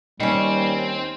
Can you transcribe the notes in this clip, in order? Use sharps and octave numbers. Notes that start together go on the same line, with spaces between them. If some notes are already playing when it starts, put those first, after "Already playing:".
D#2 G3 C4 C#4 D#4